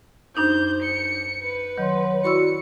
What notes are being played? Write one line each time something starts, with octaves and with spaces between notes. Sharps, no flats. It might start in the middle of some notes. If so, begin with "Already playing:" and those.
F#2 D4 D#4 C5 G6
C#7
B4
D#3 F#3 C#5 C6
E4 F#4 D5 B5 C#6 E6 C#7